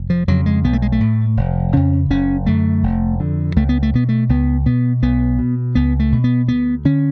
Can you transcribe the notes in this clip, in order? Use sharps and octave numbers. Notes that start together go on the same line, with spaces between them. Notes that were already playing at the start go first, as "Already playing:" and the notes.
Already playing: F1
F3
F2 C#3 F#3
G#3
B1 B3
A3
G#3
A3
A2
F1
F2 C#3 C#4
F#1 C#4
F#2 D3 A3
F1
F2 D3
C#2 A3
B3
A3
B2 B3
A3
C#2 B3
B2 B3
B1 B3
B2
C#2 B3
A3
B2
B3
D2 B3
D3 C#4